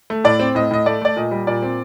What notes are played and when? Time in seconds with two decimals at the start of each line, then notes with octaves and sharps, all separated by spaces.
0.10 A3
0.24 A2 D5
0.40 C4
0.55 A2 D#5
0.71 A2 D#5
0.86 A3 D5
1.01 A3 D5
1.16 A#2 D#5
1.31 G3
1.47 A#2 D5
1.62 C4